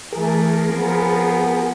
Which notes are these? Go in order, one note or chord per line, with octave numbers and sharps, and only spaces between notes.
E3 A3 G#4 A#4
F3 B3